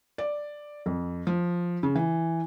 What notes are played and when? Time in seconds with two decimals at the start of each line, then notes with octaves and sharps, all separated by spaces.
0.18 D5
0.86 F2
1.27 F3
1.83 C#3
1.96 E3